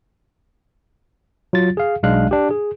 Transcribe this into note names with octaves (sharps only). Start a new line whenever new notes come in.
F#3 F4 A6
G#4 F5
B1 G#3 D4 F5 F#6
D4 G4
G#4